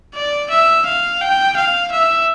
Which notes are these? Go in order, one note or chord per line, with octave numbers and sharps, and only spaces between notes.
D5
E5
F5
G5
F5
E5